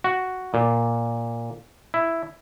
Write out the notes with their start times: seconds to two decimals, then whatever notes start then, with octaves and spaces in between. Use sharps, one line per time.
0.04 F#4
0.54 A#2
1.94 E4